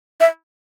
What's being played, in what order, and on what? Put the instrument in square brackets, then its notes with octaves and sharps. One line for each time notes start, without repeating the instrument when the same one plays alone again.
[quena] E5